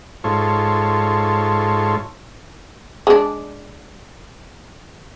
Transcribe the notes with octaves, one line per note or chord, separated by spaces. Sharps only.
G#2 F4 A4 C#5
G#3 D4